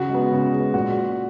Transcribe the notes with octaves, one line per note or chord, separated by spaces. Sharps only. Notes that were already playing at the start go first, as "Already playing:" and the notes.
Already playing: C#3 F#4
G#3 B3
C#3
G#3 B3
A#2 F#4